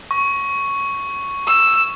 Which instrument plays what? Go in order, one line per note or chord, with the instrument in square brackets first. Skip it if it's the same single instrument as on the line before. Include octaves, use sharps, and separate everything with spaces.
[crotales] C#6
[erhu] E6